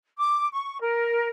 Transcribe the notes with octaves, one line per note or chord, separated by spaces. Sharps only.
D6
C#6
A#4